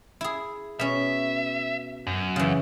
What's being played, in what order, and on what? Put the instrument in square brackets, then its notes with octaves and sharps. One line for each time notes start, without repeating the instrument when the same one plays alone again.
[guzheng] E4 G#4
[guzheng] B2 C#4 [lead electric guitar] E5
[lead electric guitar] F#2
[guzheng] C#3 E3